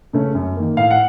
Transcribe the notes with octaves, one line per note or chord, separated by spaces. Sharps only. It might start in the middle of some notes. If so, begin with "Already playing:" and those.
C#3 A3 C#4
F#2
D#3 A#3
A2 F5
F#5